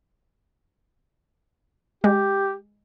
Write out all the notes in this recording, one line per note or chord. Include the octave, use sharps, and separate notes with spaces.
G#3 G4